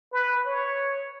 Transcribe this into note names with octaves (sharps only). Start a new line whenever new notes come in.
B4
C#5